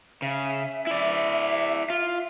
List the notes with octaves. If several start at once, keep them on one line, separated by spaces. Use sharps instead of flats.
C#3 E5
E4 D5
F4